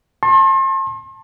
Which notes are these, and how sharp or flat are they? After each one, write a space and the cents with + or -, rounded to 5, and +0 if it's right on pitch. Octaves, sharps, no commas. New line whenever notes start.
A5 +20 C6 +40